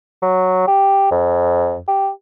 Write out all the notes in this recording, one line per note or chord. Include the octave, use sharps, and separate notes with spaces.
F#3
G4
F2
G4